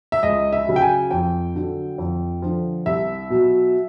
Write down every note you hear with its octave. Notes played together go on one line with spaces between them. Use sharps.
E5
C#2 D#5
E5
C#3 F#3
G5
G#5
F2 G5
D3 F#3
F2
D3 F3
C2 E5
B2 F#3